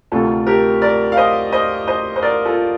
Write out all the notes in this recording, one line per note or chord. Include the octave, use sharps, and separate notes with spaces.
D2 C3 D#3 A3 F4 A4
G4 A#4
A#4 D5
F5
C5 D#5
C5 D#5
C5 D#5
C5
A#4 D5
F4 A4